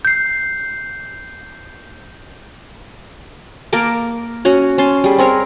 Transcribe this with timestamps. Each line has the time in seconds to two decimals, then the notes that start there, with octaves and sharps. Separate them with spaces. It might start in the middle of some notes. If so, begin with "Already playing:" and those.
0.05 G6 C7
3.73 A#3 A#4 A5 D6
4.45 C#4 F#4 C#5
4.78 C#4 A5 C6
5.04 G3 G#4
5.18 C4 G#4 A#4 C#5